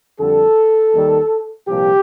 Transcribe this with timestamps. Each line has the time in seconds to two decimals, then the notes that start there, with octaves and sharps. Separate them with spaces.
0.18 F2 D3 G3 A4
0.93 D#2 D#3 G3
1.67 C2 A#2 F3 G4